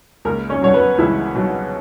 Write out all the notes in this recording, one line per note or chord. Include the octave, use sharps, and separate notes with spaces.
C#2 A#3 A#4
C#4 C#5
B2 F#3 C#5
B3 B4
C#2 E3 E4
B2 F#3